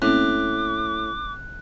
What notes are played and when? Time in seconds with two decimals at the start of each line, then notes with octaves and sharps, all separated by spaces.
0.02 A2 A#3 C4 C#4 D6 F#6